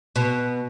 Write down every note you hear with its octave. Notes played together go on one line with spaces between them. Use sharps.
B2